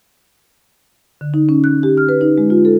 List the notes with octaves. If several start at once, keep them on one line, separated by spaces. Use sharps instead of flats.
D3
D#4
C#4
F#6
G4
F6
B4
D#4
G#3
F4
A4